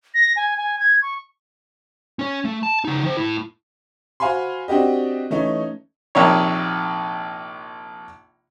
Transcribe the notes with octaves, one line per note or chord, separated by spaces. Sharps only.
A#6
G#5
G#5
G#6
C#6
C#4 C#5
A3
A5
C#3 D#4
D#3 C5
A3 E4
F#4 C5 F5 G#5 B5 C6
C4 D4 F#4 G4 D#5
E3 A3 C#4 D#4
A#1 C3 D#3 C#5